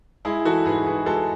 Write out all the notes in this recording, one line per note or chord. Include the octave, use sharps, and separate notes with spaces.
G#3 E4 G#4
E3 F#4 A4
G#2 G#4 B4
G#2 G#4 B4
G#3 F#4 A4